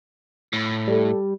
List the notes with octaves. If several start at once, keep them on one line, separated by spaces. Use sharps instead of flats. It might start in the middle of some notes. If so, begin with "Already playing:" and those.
A2
G3 A4